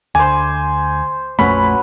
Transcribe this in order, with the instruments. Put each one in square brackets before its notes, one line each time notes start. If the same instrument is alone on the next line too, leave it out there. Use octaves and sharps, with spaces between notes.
[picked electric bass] D2 [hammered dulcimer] C5 D6 [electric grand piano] G#5
[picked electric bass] A#1 F2 A3 [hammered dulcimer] F#3 C#4 B4 [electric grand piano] B5